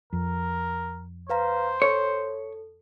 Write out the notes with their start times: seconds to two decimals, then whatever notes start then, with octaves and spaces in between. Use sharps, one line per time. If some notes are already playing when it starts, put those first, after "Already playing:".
0.13 F2 A#4
1.30 B4 C5 F5 A#5
1.82 A4 C#5